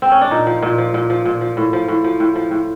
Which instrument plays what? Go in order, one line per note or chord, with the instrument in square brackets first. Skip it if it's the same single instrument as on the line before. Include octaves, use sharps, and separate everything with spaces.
[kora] C4
C#4
D4
A#2 D#4
F3
A#2
F3
A#2
F3
A#2
F3
A2
F3
A2
F3
A2
F3
A2